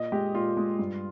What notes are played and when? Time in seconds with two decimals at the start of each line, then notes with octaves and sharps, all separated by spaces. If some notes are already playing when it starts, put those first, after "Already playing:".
Already playing: A#2 D#5
0.12 G#3 G4
0.34 A#2 F4
0.57 G#3
0.79 G2